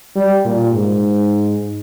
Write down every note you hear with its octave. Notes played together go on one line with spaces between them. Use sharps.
G3
A#2
G#2